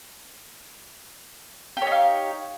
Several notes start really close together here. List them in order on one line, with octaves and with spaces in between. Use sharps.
G4 C#5 D#4 F5